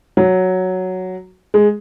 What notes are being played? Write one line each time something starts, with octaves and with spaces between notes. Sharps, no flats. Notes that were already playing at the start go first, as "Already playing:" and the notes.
F#3
G#3